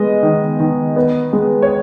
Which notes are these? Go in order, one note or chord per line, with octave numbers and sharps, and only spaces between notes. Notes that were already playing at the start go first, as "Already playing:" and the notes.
Already playing: G#3 B3 D#5
D#3
D#3
B3
G#3
C#5